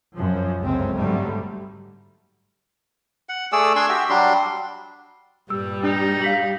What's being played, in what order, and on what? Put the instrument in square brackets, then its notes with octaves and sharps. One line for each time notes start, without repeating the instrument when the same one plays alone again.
[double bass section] F#2 F3
G1 C#2 F#2 G#3 C4 C#4
G#2 D3 F#3 G3 A3
[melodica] F#5
A3 G#4 D5 E6
D4 G#5 C6 E6
F#4 G4 E5
F#3 G3 D4 C6
[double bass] G2 A#2 [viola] G3 [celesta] E6
[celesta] D4 [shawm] D#4
[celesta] F5 B6 F#7